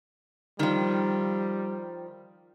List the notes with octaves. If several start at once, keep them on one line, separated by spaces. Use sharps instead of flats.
D#3 F3 G3